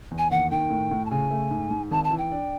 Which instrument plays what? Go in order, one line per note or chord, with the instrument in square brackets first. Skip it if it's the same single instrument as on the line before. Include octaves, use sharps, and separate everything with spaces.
[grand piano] E2
[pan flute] G#5
[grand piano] D#2 [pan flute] F#5
[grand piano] D#3 [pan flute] G5
[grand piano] A2
A2
[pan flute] A5
[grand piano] C#3 [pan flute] G#5
[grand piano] A3
G#2
G#2
[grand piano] G#1 [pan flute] A5
[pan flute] A5
[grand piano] E3
[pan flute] G5
[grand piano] D4